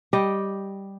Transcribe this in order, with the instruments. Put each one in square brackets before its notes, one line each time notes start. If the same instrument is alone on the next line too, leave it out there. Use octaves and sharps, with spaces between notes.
[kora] G3 G4 D#5